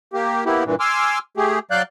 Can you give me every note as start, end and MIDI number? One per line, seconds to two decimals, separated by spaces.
0.13 0.45 58
0.13 0.45 67
0.46 0.64 58
0.46 0.64 59
0.46 0.64 64
0.46 0.64 67
0.65 0.75 43
0.65 0.75 46
0.65 0.75 52
0.80 1.19 80
0.80 1.19 84
0.80 1.19 86
0.80 1.19 88
0.80 1.19 89
1.37 1.59 57
1.37 1.59 67
1.37 1.59 68
1.71 1.82 54
1.71 1.82 74
1.71 1.82 77
1.71 1.82 90
1.71 1.82 91